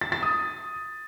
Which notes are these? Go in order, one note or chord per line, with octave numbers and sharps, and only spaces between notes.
A6
A6
D#6